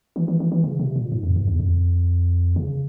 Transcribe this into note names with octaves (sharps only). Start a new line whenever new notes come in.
E3
E3
E3
E3
C#3
C3
A#2
G#2
F2
G2
E2
F2
C#3